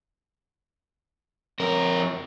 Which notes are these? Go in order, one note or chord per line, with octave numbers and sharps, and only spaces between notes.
F2 A#4